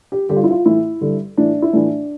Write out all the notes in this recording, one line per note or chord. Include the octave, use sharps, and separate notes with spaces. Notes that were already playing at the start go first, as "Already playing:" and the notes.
G4
G2 D3 G4
F4
E4
F4
A2 E3 E4
G2 D3
A2 E3 D4
E4
A2 E3 D4